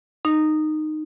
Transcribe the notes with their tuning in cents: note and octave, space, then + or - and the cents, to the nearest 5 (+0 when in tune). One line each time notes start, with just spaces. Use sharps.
D#4 -15